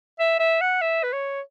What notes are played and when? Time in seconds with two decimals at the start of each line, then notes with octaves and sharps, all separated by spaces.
0.19 E5
0.40 E5
0.61 F#5
0.81 E5
1.03 B4
1.13 C#5